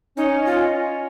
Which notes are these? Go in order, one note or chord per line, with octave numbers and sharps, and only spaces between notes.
C#4 D#4
D#5
F4
C#4